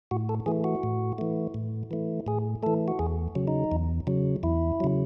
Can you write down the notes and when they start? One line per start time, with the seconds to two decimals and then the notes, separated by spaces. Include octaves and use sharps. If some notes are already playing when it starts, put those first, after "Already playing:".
0.11 A2 F#4
0.29 A4
0.46 E3 A3 G#4
0.64 F#4
0.83 A2
1.18 E3 A3
1.54 A2
1.91 E3 A3
2.27 A2 G#4
2.63 E3 A3 A4
2.88 F#4
2.99 E2 G#4
3.35 C#3 F#3
3.48 D#4
3.72 E2
4.07 C#3 F#3
4.43 E2 E4
4.80 C#3 F#3